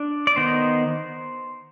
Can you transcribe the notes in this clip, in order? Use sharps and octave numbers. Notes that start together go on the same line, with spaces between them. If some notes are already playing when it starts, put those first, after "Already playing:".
Already playing: D4
D5
D#3 B3 D#4 C5